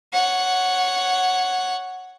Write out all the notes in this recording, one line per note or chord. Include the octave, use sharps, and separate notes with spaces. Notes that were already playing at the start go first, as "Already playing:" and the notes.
C#5 F#5